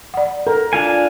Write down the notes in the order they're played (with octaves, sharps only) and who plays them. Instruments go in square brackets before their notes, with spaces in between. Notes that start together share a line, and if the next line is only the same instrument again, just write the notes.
[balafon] D5 F#5
[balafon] A4 [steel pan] A#4
[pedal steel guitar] D4 F4 G#5